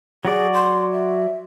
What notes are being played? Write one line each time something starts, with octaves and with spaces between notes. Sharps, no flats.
F#3 F#4 G#4 D5
C6
E5